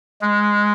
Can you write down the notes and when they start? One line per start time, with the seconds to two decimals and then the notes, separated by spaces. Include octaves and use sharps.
0.22 G#3